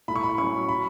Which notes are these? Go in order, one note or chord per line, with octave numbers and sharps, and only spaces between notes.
A2 B5
C#6
B5
F#3 C#4 C#6
B5